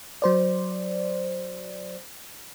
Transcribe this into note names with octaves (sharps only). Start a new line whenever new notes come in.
F#3 C5 D5